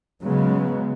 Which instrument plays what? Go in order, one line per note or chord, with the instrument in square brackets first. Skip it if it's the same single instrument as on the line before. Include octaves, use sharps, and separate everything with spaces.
[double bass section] C#3 G#3 B3 [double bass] F#3